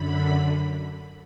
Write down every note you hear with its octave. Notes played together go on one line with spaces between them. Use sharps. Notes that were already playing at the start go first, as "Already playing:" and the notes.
Already playing: F#2 D3 B5